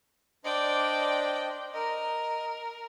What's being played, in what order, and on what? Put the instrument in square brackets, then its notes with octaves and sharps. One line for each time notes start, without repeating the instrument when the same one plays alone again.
[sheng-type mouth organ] D4 C5 D#5 [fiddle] D5 G5
[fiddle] A#4 [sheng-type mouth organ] D#5